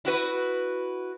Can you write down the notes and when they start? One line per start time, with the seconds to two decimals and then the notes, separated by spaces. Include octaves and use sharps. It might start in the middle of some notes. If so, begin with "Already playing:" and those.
0.05 E4 F#4 B4